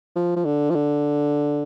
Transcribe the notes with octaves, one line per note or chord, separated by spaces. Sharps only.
F3
F3
D3
F3
D3